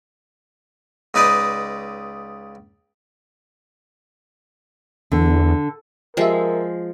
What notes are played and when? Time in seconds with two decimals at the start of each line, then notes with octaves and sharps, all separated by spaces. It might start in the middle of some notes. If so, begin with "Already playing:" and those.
1.14 C#2 D#4 B4 D5 D#5 D#6
5.12 E2 D3
6.17 F3 G#3 G4 A#4 E5